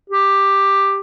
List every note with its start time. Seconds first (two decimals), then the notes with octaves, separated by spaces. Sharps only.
0.10 G4